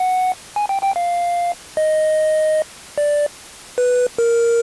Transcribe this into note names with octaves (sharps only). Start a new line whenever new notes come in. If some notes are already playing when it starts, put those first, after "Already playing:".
Already playing: F#5
G#5
G5
G5
F5
D#5
D5
B4
A#4